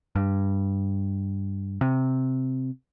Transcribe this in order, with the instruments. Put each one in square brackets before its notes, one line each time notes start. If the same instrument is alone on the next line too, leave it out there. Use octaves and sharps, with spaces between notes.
[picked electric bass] G2
C3